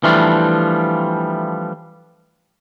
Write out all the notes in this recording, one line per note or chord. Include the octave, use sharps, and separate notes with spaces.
E3 F3 G3 A3 D4 F4